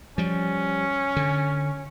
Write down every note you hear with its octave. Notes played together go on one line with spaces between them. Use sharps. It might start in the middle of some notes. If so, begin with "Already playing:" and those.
F3 G3 C#4
D3